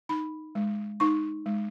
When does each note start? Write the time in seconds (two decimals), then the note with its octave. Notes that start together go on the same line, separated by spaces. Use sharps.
0.09 D#4 B5
0.55 G#3
1.00 D#4 C#6
1.46 G#3